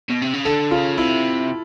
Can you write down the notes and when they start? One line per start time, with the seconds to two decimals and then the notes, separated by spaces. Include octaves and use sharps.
0.10 B2
0.22 C3
0.34 C#3
0.45 D3 A4
0.71 C#3 F4
0.97 C3 E4